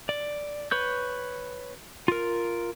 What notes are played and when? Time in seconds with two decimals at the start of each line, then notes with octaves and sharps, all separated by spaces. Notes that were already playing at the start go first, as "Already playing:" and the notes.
0.09 D5
0.71 B4 C#5 G6
2.08 F4 A#4